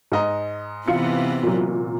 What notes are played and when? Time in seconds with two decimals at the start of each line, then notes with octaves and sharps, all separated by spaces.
0.12 G#2 D#5 A#5
0.88 C3 E3 B3 F4 C#7
1.43 A#2 F#3